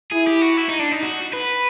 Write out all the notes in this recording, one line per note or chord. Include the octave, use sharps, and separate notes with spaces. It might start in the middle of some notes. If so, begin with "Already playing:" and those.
E4 G#4
G4
F#4
E4
D#4
D4
D#4
F#4
B4